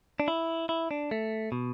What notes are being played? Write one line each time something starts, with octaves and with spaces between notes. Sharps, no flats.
D4
E4
E4
D4
A3
B2